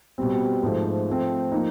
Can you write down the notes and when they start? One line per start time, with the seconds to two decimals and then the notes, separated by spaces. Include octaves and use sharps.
0.18 B2 G3 C4
0.63 G#2 F3 A3
1.08 F3 A3 C4
1.52 F3 A#3 D#4